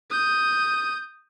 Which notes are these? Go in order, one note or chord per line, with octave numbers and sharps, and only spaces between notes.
D#6 G6